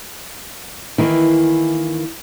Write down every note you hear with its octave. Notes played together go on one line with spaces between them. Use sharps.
D#3 E3 A#3 E4